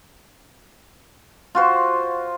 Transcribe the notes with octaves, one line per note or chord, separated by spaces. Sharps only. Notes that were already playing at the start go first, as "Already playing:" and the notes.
F4 F#4 C5